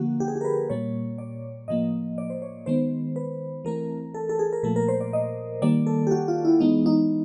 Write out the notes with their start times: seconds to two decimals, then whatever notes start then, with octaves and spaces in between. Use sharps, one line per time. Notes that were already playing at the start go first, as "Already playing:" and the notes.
Already playing: D3 F3 A#3 F#4
0.20 G4
0.28 G#4
0.35 G4
0.41 A#4
0.45 B4
0.70 A#2 G3 A#3 C#5
1.18 D5
1.68 A2 F3 A#3 D#5
2.18 D5
2.30 C5
2.42 C#5
2.66 D#3 G#3 B3 C5
3.16 B4
3.65 E3 A3 C4 A#4
4.14 A4
4.29 A4
4.39 G#4
4.53 A#4
4.63 A#2 F3 A3 A4
4.76 A#4
4.88 C5
5.01 D5
5.13 D#5
5.62 D#3 G3 A#3 D5
5.87 A4
6.07 G4
6.11 F#4
6.28 F4
6.45 E4
6.60 E3 G#3 B3 D#4
6.86 D#4